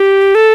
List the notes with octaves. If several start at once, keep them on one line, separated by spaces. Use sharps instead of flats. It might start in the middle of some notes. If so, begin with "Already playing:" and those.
Already playing: G4
A4